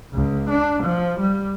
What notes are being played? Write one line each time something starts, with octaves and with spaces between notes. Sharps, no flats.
C#2
D4
F3
G3